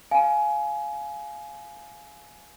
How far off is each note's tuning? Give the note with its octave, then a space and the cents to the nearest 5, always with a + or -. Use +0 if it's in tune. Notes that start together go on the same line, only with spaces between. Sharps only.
F5 +0 G#5 +20